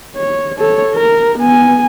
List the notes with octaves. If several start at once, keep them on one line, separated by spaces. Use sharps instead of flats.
C#5
A4 C#5
A#4
B3 G#5